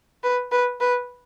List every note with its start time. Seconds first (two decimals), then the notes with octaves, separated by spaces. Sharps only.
0.23 B4
0.52 B4
0.80 B4